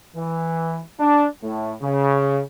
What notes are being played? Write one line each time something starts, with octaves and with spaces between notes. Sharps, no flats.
E3
D4
A2
C#3